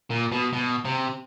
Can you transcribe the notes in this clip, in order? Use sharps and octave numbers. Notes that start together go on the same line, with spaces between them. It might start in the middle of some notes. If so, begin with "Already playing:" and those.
A#2
B2
B2
C3